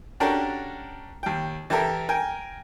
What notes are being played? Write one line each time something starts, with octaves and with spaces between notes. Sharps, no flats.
C#4 D4 F#4 G4 A4 A#4
D#2 G5
E3 G4 A4 A#4 E5
A#4 G5 G#5